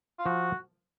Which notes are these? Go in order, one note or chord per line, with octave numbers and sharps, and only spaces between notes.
F4
F3 F#4